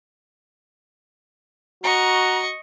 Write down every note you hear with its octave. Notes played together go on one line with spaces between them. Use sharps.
F#4 D#5 A#5 C#6